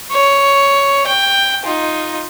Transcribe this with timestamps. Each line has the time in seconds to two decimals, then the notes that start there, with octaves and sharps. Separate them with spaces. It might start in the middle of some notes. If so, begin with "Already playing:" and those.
0.11 C#5
1.07 G5
1.65 D#4 F4